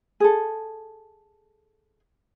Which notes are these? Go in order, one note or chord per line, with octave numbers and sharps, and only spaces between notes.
G#4 A4